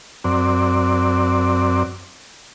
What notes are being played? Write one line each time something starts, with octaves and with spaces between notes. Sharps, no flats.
F#2 C4 D5